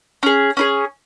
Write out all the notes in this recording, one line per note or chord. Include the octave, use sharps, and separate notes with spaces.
C#4 G#4
C#4 E4 G#4